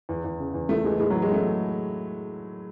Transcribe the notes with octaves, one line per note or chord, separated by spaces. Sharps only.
E2
E2
C#3
E2
E3 A3
E3 G#3
A2 G#3
F#3
E3
G#3
E3 A3